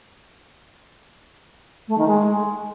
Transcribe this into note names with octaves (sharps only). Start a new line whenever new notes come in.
A3
D#3
G#3